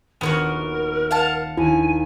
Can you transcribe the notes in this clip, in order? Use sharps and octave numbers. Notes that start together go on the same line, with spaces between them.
D#1 B3 E4 F#4 A#4
F5 F#5 A5
D#2 E4 G#5